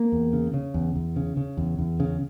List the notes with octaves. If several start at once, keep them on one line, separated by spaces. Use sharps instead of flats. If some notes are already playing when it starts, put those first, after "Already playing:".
Already playing: A#3
E2
C#3
C#3
E2
E2
C#3
C#3
E2
E2
C#3